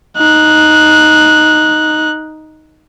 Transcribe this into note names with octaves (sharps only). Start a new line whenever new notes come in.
D#4 F#6